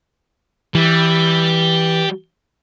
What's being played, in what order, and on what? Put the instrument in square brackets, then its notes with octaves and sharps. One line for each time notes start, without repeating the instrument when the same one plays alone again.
[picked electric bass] E3 [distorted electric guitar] G3